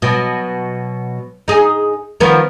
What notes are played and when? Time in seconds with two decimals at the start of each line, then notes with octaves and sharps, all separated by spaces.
0.02 B2 F#3
1.48 D#4 G#4
2.20 D#3 F3 B3